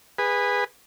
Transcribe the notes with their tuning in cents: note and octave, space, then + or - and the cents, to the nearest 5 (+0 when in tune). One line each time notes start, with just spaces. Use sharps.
G#4 -25 B4 +0